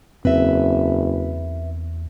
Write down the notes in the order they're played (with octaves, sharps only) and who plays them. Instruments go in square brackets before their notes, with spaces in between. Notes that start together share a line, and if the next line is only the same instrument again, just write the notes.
[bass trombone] F#1 [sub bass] E2 [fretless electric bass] C4 [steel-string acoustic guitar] B4 E5